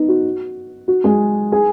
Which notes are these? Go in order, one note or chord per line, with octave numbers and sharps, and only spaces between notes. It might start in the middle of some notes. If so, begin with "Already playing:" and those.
Already playing: B3 D#4
F#4
F#4
G#3 G#4
G#4 G#5